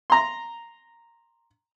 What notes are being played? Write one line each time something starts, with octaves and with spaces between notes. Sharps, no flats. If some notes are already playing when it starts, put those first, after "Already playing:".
A#5 C6